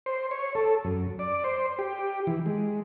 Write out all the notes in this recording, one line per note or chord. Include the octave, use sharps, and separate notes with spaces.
C5
C#5
A4
F#2
D5
C5
G4
E3
G#3